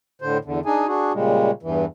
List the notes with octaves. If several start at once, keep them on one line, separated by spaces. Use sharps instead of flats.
A2 D3 C5
E2 D3
D4 D#4 G#4 G#5
D4 F#4 G#4
A#2 C#3 G3 G#3
E2 G2 E3